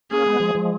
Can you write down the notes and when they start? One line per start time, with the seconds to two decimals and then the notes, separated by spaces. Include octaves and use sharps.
0.11 A#3 C#4 G#4
0.26 G#3 B3
0.40 F3 G#3
0.55 F3 G#3